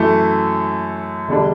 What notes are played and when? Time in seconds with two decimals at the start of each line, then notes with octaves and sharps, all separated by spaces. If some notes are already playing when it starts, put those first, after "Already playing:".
Already playing: F#2 E3 A3
1.28 E1 D3 G3 D4